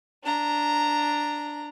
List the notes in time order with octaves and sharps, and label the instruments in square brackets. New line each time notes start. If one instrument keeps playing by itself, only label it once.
[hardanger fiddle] D4 A#5